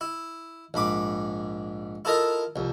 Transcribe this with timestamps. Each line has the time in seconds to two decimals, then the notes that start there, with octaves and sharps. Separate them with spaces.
0.01 E4
0.74 A#1 G#2 B5 D6
2.05 E4 F4 A4 A#4 D#5 F5
2.56 C2 F2